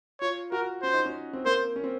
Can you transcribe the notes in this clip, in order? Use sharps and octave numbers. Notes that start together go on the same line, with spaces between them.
F4 C#5
F#4 A#4
C#4 C5
D#4
C#4
C4
A#3 C5
C#4
C4